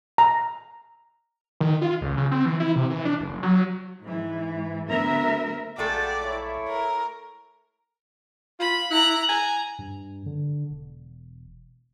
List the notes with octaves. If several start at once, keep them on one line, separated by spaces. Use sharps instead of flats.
A#5
D#3
F4
C#2
C#3
C4
E3
E4
C3
E3
D4
F#1
F#3
G#2 E3
D2 B3 A#4 E5
A#1 G#3 A3 F#4 A4 D5 F#5 G5
E4 C#5
A#4
F4 B5
E4 A#5 F#6
G#5 A#5
G2
D3
E1